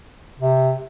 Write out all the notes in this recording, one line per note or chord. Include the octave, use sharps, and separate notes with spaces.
C3